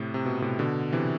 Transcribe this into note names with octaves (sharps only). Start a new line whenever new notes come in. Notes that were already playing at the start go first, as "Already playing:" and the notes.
Already playing: A2 C3
C3
B2
A2 C3
B2 D3
C3 E3